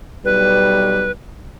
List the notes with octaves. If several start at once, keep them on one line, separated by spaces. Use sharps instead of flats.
B1 G3 B4